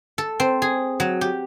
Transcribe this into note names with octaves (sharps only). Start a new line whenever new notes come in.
A4
C4
G#4
F#3
G4